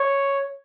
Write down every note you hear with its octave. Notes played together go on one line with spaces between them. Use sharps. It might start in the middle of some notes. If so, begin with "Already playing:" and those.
Already playing: C#5